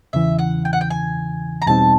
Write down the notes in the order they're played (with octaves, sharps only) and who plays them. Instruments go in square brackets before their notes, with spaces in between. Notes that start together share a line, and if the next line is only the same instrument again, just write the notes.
[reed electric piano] E2 C#3 E3 [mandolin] E5
[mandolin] F#5
G5
F#5
G5
G#5
A#5
[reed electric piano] E2 B2 G3 C4 D#4 [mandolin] A5